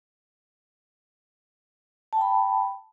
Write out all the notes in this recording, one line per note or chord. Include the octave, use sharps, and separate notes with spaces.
G5 A5 B5